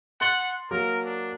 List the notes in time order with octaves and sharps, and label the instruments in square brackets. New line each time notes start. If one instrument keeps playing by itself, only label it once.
[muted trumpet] F#5 [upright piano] C6 A6 G7
[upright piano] F#3 A#3 [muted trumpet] A#4
[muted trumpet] D4